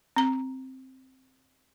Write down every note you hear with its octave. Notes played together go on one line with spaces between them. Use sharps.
C4 A#5